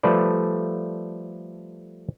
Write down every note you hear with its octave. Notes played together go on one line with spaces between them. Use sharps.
F3 G3 A3 A4 B4 D5